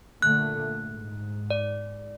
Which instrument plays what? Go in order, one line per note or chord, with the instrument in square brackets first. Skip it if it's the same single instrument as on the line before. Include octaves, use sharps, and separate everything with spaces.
[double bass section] A#2 D3 A3 [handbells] F#6
[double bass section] G#2
[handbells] D5